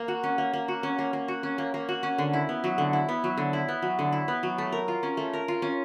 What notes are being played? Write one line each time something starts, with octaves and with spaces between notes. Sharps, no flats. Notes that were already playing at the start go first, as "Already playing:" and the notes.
Already playing: A#3
F#4
C#4
A#3
A#3
F#4
C#4
A#3
A#3
F#4
C#4
A#3
A#3
F#4
C#4
D3
E4
B3
F#3
D3
E4
B3
F#3
D3
E4
B3
F#3
D3
E4
B3
F#3
A3
A#4
F4
C#4
A3
A#4
F4
C#4